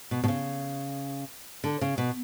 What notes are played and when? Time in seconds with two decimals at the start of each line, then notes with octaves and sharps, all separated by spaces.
0.11 B2
0.24 B2
0.28 C#3
1.64 D3
1.81 C#3
1.98 B2